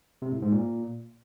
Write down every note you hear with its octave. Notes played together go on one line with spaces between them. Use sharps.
C3
A2
G#2
A#2